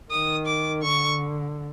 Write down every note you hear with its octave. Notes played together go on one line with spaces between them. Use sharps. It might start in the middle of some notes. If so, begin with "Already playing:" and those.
D#3 D#6
D6
D3 C#6